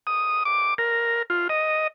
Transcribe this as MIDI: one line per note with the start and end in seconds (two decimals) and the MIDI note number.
0.07 0.43 87
0.45 0.74 86
0.78 1.22 70
1.30 1.48 65
1.49 1.87 75